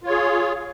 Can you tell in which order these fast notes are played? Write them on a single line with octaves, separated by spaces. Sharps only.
F4 C#5 G#4